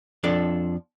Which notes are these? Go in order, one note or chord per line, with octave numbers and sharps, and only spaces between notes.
F2 F3 D4 A4 D5